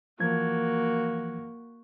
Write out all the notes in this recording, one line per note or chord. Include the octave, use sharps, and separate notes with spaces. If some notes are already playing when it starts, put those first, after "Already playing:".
E3 F3 A#3 F#4 G#6